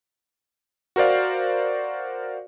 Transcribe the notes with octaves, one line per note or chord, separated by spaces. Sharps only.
F#4 A#4 C5 D5 F5